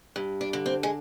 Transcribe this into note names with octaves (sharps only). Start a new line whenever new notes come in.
G2
D4
D3
C4
G#3